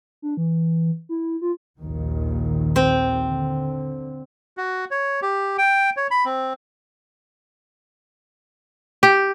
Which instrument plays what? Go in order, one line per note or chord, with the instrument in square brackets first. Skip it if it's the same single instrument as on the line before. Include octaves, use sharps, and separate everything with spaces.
[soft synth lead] D4
E3
E4
F4
[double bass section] A#1 D#2 D#3
[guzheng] C4
[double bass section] D3
[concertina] F#4
C#5
G4
G5
C#5
B5
C4
[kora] G4